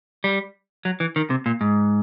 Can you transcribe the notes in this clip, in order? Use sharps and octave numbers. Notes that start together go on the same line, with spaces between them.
G3
F#3
E3
D#3
C3
A#2
G#2